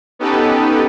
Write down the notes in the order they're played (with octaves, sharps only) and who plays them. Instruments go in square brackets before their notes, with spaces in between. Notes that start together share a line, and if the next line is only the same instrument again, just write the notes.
[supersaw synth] B3 C#4 D#4 G4 A4 B4